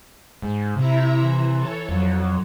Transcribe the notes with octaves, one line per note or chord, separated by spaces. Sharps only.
G#2
C3 E4 E5 A#5
E3
A4 C#5
F2 F#3